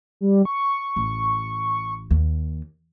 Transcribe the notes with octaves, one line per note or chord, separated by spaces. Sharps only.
G3
C#6
A1
D#2